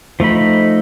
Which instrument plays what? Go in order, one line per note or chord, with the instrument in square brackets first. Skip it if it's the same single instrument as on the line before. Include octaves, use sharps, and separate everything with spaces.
[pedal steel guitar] F3 A3 D#4 B5